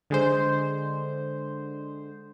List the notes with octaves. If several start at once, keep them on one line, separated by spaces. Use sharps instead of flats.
D3 G#3 C5